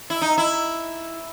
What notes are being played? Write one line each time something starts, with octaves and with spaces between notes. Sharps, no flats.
E4
D#4
E4